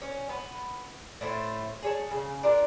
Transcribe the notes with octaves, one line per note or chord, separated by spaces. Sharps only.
C#4
B3
A2 A3 C5
G#4 C#5 A5
C#3
D4 F4 A#4